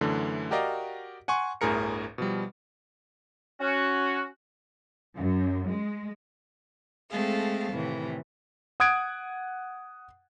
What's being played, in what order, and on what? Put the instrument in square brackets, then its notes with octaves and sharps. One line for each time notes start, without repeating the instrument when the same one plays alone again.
[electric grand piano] F#2 D3 E3 A3
F#4 G4 A#4 D5 D#5 F5
F#5 G#5 C6 C#6
G1 D2 A2 G#4 A#4 C#7
B2 F3 G3
[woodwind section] C#4 F#4
[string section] F#2
G#3
[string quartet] G#3 A3 C4 G#4 A4 F5
A2 C3 D#3 E3
[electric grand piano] F#5 D#6 F#6 G#6 D7